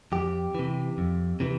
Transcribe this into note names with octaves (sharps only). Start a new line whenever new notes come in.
F2 G4
C3 E3
F2
C3 E3